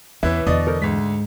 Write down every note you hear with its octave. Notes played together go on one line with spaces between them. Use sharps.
E2 E3 C#4 E4 B4 E5
E2 B2 D3 D5 D#5
A4 A#4 C5
D2 G#2 G#3 B6